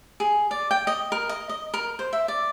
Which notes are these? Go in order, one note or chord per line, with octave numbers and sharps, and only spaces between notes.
G#4
D5
G5
D#5
A#4
D#5
D#5
A#4
C5
E5
D5